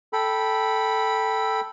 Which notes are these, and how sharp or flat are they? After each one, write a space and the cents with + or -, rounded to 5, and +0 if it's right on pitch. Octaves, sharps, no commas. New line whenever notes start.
A4 +0 G5 +0 B5 -10